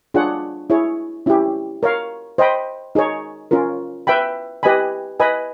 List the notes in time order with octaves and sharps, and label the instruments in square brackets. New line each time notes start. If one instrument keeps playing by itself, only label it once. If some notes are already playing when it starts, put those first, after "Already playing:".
[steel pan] D4 F4 G#4 C#5 F#5
E4 G#4 C#5
C#4 E4 G4
A#4 C#5 F5
C5 D#5 G5 B5
D#4 G#4 C#5
C#4 F4 A#4
B4 E5 G5 B5
G4 B4 D#5 G#5 B5
B4 D#5 G#5 B5